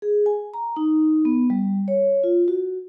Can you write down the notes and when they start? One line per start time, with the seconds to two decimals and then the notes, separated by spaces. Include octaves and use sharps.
0.02 G#4
0.26 G#5
0.54 A#5
0.76 D#4
1.25 B3
1.50 G3
1.88 C#5
2.24 F4
2.48 F#4